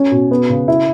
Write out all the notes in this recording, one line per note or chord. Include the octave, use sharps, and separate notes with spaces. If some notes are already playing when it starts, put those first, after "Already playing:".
Already playing: C#4
B2
B3
C#3
E4